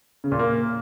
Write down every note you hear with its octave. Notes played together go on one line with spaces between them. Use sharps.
C#3
A#2
A#3